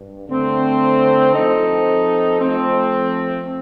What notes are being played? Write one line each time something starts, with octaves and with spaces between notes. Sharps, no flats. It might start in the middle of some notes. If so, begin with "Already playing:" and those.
Already playing: G2
D3 A3 C4
F3 C4 D#4 A4
F3 A3 C4